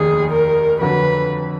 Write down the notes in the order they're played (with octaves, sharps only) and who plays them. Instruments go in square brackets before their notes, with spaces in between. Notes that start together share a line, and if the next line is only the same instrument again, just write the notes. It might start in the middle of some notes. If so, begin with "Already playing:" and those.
Already playing: [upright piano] F1 D#2 D#3 [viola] G#4
[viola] A#4
[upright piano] F2 D3 F#3 [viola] B4